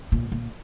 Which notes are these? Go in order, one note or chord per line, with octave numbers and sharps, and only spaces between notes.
A#2
A#2